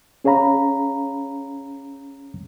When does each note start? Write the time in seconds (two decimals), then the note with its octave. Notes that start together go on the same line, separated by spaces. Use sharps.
0.24 C#4 G#4 C#5 F5 A#5 B5